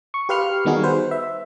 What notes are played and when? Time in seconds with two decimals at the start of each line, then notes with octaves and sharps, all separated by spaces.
0.14 C#6
0.29 G4 B4 F5 C6 F6 C#7
0.65 D#3 G3 B3 D#4 F#4 G#4
0.83 B4 C5
1.11 E5